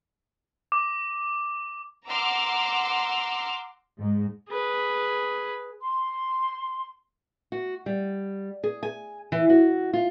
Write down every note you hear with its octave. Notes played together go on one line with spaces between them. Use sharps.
D6
F#5 A#5 C6 D6 E6 F6
G#2
G#4 B4
C6
F#4
G3
G#4
G#5
E3
F#4
F4